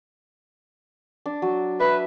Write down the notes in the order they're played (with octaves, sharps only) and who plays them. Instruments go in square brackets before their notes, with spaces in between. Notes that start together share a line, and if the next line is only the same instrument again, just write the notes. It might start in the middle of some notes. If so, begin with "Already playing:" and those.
[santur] D4
F#3
[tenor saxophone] B4 [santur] E5